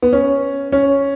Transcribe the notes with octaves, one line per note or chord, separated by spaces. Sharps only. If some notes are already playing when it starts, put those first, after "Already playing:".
B3
C#4
C#4